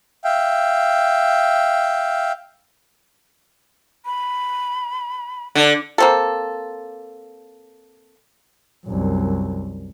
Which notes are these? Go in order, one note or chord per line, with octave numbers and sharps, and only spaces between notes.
E5 F5 G5
B5
D3
A#3 C4 A4
C2 F#2